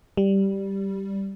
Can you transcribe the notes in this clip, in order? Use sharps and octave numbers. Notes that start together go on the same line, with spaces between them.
G3